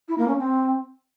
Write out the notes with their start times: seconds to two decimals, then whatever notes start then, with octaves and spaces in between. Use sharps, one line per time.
0.08 E4
0.18 A#3
0.28 C#4
0.38 C4